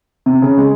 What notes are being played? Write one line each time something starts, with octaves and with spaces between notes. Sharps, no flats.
C3
C#3
G#3